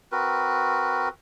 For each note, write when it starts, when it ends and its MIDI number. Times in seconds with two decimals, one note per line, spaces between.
0.12 1.09 60
0.12 1.09 66
0.12 1.09 70
0.12 1.09 71